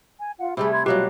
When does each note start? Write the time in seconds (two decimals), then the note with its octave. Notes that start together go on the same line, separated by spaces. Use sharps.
0.20 G#5
0.40 F4 F5 F#5
0.57 C3 G3 A3 G4 G#4 B5
0.72 B5 C6 G#6
0.86 B2 F#3 G3 F4 G4 F#6